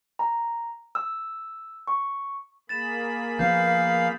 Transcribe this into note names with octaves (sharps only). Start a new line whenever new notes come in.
A#5
E6
C#6
A#3 G#4 B5 A6 E7
F3 B3 F5 G6